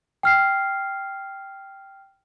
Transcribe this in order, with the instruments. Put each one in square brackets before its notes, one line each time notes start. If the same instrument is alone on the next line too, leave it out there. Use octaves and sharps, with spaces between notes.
[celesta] G5 F6 C7